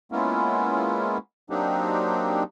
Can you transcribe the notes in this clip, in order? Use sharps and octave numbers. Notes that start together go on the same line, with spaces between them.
G#3 A#3 B3 C#4 E4 F4
F#3 A#3 C4 D4 D#4 G4